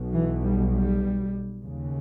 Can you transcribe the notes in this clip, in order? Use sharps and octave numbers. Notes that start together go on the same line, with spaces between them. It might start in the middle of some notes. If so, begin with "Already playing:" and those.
Already playing: B1 B2
E3
G3
G3
D#2 C#3